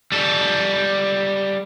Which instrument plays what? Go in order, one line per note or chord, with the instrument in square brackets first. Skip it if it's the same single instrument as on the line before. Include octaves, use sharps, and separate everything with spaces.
[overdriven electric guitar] G3 A4